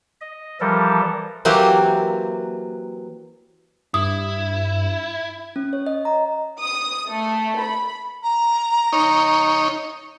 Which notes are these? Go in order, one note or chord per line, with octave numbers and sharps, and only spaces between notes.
D#5
E3 F3 G3 A4 A#4
E3 F#3 A#3 C4 G4
G2 E4 D#6
C#4
C#5
D#5
A#5
D#6
A3
B5
A#5
D#4 C#5